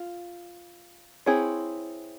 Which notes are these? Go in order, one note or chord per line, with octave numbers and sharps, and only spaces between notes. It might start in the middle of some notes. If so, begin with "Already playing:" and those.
Already playing: F4
C4 E4 G#4 C#5